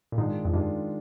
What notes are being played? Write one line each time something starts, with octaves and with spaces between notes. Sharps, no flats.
A#2
G#2 D#3 G#3 D4 F4
F2
G2 D#3 G#3 D4 F4